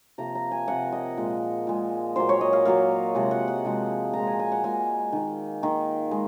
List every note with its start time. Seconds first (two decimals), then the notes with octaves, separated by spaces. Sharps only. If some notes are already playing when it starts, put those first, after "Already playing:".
0.18 C3 F3 A#3 A#5
0.35 A#5
0.51 G#5
0.68 C3 F3 A#3 F#5
0.92 D#5
1.17 A#2 G#3
1.67 A#2 G#3
2.16 A#2 F#3 A#3 C5
2.29 C#5
2.41 D#5
2.53 F5
2.65 A#2 F#3 A#3 F5
3.15 C3 F3 G#3 F#5
3.31 F#5
3.48 F#5
3.65 C3 F3 G#3
4.13 A#2 G#3 A#5
4.27 G#5
4.39 G#5
4.52 F#5
4.64 A#2 G#3 G#5
5.12 D#3 A#3
5.62 D#3 A#3
6.11 G#3